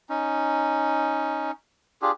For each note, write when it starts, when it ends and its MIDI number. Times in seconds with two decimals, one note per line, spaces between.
0.10 1.51 61
0.10 1.51 63
2.02 2.12 62
2.02 2.12 65
2.02 2.12 67
2.02 2.12 68